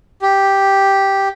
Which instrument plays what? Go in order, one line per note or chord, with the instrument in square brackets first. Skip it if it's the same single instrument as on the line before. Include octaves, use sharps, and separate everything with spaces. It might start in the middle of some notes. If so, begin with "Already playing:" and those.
[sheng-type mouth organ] G4